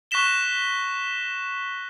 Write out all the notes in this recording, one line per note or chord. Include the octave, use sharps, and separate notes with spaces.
C#6 F#6 A#6 B6 E7 G7